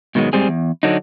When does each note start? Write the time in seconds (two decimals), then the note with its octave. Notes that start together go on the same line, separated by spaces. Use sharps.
0.15 G#2 B2 D#3 F#3 G#3
0.33 G#2 G3 C4 G#4
0.48 E2
0.83 D3 F#3 D4 D#4